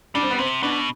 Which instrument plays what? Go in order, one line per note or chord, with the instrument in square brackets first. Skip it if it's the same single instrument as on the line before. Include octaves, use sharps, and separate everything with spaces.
[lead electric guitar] G3 [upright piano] D4
[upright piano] C4
B3
[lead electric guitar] C3 [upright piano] C4
[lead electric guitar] B2 [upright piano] B3 D4